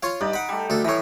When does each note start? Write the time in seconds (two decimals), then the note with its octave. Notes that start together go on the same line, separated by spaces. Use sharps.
0.03 F4 C#5 F5
0.21 G2 D#4 D5
0.33 F#5 B5
0.49 G3 A3
0.70 D2 A4
0.85 A2 E3 C#5 A#5